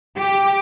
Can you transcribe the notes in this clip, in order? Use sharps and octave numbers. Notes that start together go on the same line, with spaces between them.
G4